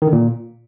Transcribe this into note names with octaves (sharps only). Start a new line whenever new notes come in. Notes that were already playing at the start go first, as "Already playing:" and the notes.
D#3
D3
A#2